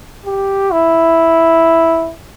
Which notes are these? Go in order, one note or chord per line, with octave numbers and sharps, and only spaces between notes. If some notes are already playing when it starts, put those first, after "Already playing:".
G4
E4